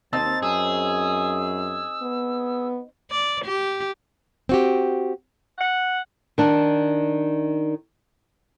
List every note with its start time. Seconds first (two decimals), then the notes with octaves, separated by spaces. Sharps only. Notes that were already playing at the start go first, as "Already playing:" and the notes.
0.13 D#2 C4 D#4 A5 A6
0.43 F#2 G#4 E6
2.02 B3
3.11 D5
3.45 G4
4.49 C4 F#4 G4
5.58 F#5
6.38 D#3 D4